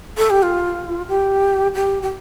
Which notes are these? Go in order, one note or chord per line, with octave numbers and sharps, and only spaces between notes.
A4
G4
F4
G4
G4
G4